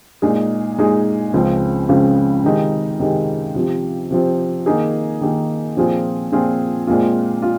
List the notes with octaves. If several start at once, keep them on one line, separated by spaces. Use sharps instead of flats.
A#2 G#3 D#4 G#4
A#2 G#3 D#4 G#4
C#2 C#3 F3 C4
C#2 C#3 F3 C4
C3 D#3 G#3 D#4
C3 D#3 G#3 D#4
C3 F3 C4
C3 F3 C4
D#3 A#3 D#4 G#4
D#3 A#3 D#4 G#4
A#2 F3 C4 F4 G#4
A#2 F3 C4 F4 G#4
A#2 G#3 C4 F4
F4